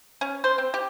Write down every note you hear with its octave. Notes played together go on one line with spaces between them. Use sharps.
C#4
C5
C4
G4